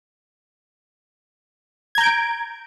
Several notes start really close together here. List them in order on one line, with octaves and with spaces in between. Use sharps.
G#6 A#5 G6 D7